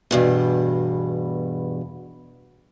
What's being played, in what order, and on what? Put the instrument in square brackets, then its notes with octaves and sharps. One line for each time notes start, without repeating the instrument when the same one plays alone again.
[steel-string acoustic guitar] E2 G2 B2